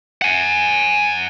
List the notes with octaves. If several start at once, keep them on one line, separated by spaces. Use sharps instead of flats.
F#5 G#5